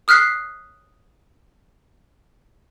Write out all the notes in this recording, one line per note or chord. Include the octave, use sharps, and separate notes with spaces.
D#6 F6 F#6 B6 C7